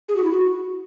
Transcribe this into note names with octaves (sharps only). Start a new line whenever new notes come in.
G#4
F#4
E4
F#4